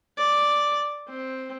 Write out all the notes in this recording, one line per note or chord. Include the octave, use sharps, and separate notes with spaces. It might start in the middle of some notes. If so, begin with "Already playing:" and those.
D5
C4